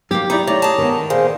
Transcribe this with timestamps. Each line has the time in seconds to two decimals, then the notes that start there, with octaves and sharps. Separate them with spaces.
0.11 F#3 A#3 G4
0.30 D#4 E4 D5 A#5
0.47 A3 C#5 D5 A#5
0.62 G#4 A5
0.78 D#3 B3
1.10 A#2 G#4 C5 F5